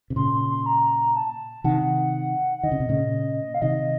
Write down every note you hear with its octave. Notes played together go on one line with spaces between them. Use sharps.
C3
A#2 C#3 C6
C6
C6
A#5
A5
C3 D#3 F#5
D#3 D#5
C#3
C3
A#2 C#3
F5
C3 D#3 D#5